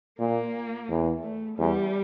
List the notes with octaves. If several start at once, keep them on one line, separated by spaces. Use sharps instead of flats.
A#2 A#3
E2
A3
E2 G3